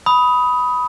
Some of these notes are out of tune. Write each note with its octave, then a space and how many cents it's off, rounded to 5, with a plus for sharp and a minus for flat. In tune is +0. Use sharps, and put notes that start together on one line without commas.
B5 +0 D#6 +15